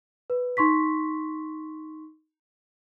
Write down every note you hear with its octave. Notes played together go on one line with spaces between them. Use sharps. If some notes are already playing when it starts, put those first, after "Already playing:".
B4
D#4 C6 C#6 B6